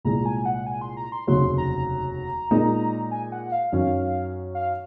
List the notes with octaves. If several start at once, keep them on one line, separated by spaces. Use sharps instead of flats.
C2 A#2 G#3 A#5
G#5
F#5
G#5
C6
A#5
C6
F1 D#2 C#3 F#3 C6
A#5
A#2 G#3 D#4 A#4
G#5
F#5
F5
F#2 D#3 F#3 C#4
F5